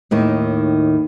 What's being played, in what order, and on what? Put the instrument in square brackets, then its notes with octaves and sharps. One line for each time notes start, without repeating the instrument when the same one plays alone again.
[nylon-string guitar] D#2 A2 D#3